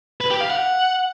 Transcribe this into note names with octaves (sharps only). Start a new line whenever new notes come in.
B4
G4
F5
F#5